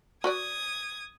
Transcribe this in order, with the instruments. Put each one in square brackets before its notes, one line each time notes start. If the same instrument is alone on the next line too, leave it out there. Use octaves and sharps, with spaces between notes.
[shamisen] F#4 B4 D5 [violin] D#6 G#6